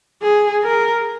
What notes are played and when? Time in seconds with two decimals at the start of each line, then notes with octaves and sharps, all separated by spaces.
0.22 G#4
0.63 A#4